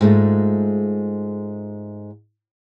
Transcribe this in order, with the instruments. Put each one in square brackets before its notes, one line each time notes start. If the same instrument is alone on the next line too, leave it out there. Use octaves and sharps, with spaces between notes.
[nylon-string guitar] G#2 G#3 A3 F4